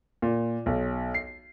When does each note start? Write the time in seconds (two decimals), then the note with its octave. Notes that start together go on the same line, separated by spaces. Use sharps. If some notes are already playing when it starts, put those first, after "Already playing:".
0.22 A#2
0.66 B1
1.14 C7